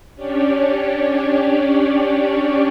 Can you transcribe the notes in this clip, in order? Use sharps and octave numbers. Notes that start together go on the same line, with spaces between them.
C#4 D4 G4 C#5 D5